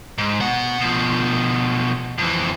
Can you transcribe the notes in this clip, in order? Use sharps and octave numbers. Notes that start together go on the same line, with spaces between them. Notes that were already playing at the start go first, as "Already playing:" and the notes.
G#2
B2 F#5
B2 F3
F2 E3